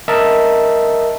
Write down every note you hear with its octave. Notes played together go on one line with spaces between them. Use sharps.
A#4 D#5 E5 A5